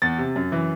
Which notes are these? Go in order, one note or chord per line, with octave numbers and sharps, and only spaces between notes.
E2 A6
C3
F#2
E3